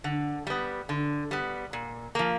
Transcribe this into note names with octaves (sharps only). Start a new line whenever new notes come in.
D3
G3 B3
D3
G3 B3
A#2
F3 A#3